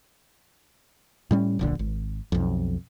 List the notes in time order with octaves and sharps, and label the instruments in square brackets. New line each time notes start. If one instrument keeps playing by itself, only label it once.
[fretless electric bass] A2 G3 C#4
D1 A#1 D3
G#1
B1 F2